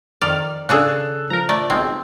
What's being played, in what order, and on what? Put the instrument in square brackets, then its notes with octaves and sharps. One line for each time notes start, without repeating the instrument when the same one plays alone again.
[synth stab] F2 D#3 F6 [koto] D5
[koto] C#3 D4 G#4 [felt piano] A4 E6 F#6
[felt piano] F3 [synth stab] A#4 A#5
[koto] A3 [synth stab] D5
[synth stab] B1 G#3 [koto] C4